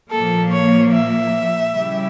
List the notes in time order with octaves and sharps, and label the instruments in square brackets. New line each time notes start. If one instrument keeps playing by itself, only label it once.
[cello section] A#2 F3 A#3 [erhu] A4
[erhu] C#5
E5
[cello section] C#3 G3 C#4 E4 G4